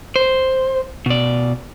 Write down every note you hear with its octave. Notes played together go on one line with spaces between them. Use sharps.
C5
B2 D5